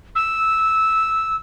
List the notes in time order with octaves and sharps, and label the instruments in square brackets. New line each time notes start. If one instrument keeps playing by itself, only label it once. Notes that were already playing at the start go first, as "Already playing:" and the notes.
[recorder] E6